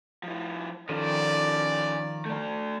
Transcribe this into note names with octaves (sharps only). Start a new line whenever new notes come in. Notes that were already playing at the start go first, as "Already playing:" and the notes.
F3 E4
D#3 F3 C#4 A4 D5
A3 D5